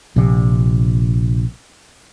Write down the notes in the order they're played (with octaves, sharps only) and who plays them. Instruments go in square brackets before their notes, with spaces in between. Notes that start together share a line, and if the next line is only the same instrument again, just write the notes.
[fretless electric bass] A#1 C3